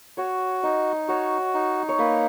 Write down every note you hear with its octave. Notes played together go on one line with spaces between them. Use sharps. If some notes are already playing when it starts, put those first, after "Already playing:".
F#4 C#5
D#4 D#5
F#4 C#5
D#4
C#5
A#3 B4